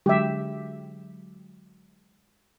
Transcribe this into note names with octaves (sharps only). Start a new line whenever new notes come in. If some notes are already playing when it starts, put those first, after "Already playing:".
D3 F#3 G#3 G4 E5